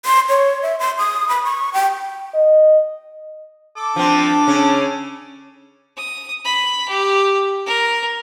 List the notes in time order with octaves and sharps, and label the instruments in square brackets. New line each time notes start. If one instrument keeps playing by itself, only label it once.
[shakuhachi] C6
C#5
E5
C6
D#6
B5
C#6
G5
[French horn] D#5
[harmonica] A4 D6
[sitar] F3 C4 [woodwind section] D4
[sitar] C#3 C#4
[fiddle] D#6
B5
G4
A#4